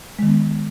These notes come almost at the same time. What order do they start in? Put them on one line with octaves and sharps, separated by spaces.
G#3 D#3 B3